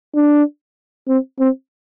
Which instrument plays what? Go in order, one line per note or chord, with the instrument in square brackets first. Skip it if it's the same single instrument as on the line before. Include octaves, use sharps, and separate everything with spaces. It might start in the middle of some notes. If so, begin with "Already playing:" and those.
[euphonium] D4
C4
C4